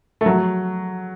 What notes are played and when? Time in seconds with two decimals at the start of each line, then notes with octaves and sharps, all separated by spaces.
0.21 A3
0.26 F#3